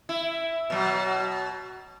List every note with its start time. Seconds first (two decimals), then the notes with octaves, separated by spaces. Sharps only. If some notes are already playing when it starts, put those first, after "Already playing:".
0.09 E4
0.70 B2 F#3